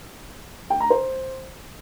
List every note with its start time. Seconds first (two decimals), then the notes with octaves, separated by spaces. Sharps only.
0.70 G5
0.80 A#5
0.90 C5